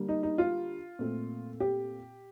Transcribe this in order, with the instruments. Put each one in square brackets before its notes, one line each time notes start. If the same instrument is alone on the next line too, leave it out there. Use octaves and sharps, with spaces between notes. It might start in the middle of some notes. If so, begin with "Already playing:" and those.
Already playing: [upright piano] D3 G3 A#3
D#4
D#4
F4
A#2 A3 C4
G4